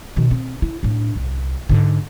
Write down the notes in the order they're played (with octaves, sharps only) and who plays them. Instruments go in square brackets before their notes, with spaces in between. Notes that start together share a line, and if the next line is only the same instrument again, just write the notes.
[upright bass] B2 D#3
C4
E4
A2 D4
C2
G#2 D3